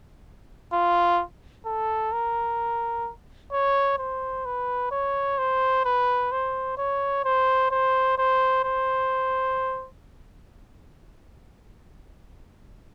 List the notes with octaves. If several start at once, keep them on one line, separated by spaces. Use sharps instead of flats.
F4
A4
A#4
C#5
C5
B4
C#5
C5
B4
C5
C#5
C5
C5
C5
C5